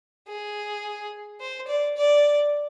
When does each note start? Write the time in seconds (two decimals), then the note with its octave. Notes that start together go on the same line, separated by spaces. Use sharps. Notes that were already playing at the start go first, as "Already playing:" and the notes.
0.28 G#4
1.40 C5
1.68 D5
1.97 D5